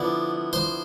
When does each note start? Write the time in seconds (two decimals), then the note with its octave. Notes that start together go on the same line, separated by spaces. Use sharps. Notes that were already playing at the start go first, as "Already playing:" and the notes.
Already playing: D3 F3 B3 E4 D5
0.53 C5